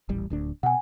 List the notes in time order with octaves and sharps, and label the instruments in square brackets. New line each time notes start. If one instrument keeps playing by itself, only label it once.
[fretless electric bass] D#1 A1 G3
D1 D2 D4
[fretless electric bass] B2 [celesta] F#5 G#5